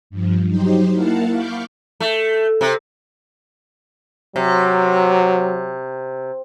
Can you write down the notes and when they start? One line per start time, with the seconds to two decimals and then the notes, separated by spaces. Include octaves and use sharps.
0.10 G2 F3
0.48 F#3 D#4 G4 C5
0.92 A#3 E4 A#4 F5 F#5 A5
1.29 F5 B5 C#6 D6 F6 G6
2.00 A3
2.61 C3
4.36 C3 F#3